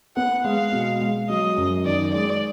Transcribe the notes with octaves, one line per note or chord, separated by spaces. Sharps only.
B3 F#5
G#3 F5
B2
G#3
F#3 D#5
F#2
D#3 D5
G#3 D5